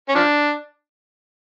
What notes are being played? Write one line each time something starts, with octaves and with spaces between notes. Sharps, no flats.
C#4
F3 D4